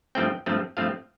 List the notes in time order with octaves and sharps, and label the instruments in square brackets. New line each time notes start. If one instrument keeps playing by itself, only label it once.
[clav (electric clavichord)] G2 F3 A3 C4 G5
G2 F3 A3 C4
G2 F3 A3 C4 F5